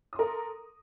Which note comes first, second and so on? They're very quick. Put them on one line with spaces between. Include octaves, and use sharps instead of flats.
D#6 C6 A#4 A4